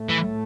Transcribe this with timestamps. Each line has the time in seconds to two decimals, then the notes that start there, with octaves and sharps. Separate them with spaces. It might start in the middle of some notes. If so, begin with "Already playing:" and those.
Already playing: A2 A3
0.09 E3